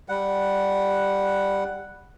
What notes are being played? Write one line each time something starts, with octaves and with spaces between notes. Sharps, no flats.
G3 F#5